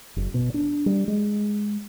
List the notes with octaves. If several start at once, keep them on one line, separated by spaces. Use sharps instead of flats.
F#1
B2
D4
G3
G#3